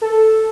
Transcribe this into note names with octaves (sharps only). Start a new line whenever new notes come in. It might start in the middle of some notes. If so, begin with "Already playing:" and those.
A4